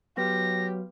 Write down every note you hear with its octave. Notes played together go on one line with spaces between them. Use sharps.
F#3 B3 G4 B4 A#6